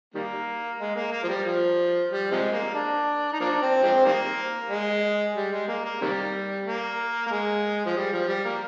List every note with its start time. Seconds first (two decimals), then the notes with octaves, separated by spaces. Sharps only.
0.14 D#3 G3 A#3
0.80 G#3
0.96 A#3
1.11 A#3
1.23 F3
1.29 G3
1.45 F3
2.09 G3
2.32 C3 F3 G#3
2.52 A#3
2.74 D4
3.33 D#4
3.41 F3 A#3 D4
3.62 C4
3.83 F3 G#3 C4
4.06 D#3 G3 A#3
4.70 G#3
5.36 G3
5.52 G#3
5.68 A#3
5.85 A#3
6.01 C3 D#3 G3
6.66 A#3
7.26 A#3
7.31 G#3
7.86 F3
7.96 G3
8.13 F3
8.28 G3
8.45 A#3